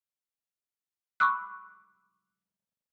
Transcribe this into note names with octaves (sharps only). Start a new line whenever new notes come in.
B5 C#6 D6 E6 F#6